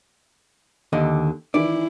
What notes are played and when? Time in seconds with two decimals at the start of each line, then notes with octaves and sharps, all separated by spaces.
0.93 D#2 D3 D#5
1.54 D#3 E3 E4 D5